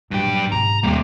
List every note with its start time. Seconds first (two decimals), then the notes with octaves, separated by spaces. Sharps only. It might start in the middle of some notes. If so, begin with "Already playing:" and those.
0.11 G2 A#2 F#3 G4
0.52 G#2 C3 A#5
0.83 D#2 G3 A#3